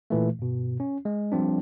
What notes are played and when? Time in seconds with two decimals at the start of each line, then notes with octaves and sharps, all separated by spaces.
0.10 A#2 E3 A3
0.39 G2 B2
0.80 C#4
1.05 G#3
1.32 F3 G3 C4 D4